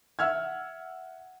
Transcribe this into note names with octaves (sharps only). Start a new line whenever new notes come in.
E5 F#5 E6 F6 G#6